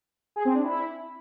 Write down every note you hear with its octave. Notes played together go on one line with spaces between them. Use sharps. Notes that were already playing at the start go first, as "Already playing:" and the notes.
G#4
C4
D4
E4